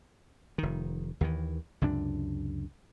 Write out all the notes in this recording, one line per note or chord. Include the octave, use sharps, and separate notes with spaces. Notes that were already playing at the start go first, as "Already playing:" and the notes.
F1 D#3
D#2 D#3 E3
C#2 F#2 C3 D4